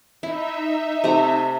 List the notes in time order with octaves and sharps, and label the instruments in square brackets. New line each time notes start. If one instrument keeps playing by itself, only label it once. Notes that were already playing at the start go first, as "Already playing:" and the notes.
[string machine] D#4 E5 [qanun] E4
[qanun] C3 A3 A#5